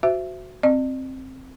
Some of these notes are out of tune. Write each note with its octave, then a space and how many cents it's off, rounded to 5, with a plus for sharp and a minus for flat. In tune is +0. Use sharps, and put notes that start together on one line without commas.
F#4 +0 C5 -25 E5 +20
C4 +10 D5 +45